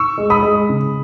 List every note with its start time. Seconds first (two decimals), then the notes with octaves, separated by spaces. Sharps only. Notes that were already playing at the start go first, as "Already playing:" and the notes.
Already playing: C#6 E6
0.18 G#3
0.30 B5 D#6
0.43 G#3
0.69 C#3